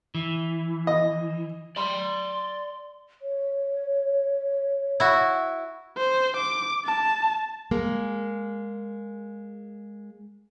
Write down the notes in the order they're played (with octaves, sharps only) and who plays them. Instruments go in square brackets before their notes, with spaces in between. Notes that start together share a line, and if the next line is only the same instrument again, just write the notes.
[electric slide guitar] E3
[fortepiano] D#5
[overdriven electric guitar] D5 B5 [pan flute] C6
[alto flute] C#5
[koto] E4 F#4
[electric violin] C5
D6
A5
[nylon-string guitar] G#3 A#3